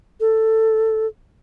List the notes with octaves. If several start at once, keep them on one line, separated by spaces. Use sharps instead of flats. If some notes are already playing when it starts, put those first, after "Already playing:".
A4